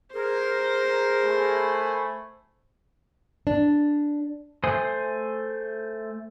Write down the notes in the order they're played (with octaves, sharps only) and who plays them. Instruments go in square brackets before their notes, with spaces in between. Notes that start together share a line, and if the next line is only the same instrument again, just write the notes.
[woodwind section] G#4 A#4 [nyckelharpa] C5
[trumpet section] A3 G#5 B5
[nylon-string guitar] D4
[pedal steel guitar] A3 C5 G#5 D#6